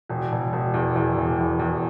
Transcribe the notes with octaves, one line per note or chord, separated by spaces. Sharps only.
E1
E1
E1
E2
E2
E1
E2
E2